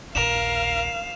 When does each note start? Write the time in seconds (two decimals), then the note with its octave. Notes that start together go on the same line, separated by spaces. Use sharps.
0.15 A#1 D#2 A#4 F5 E7 F7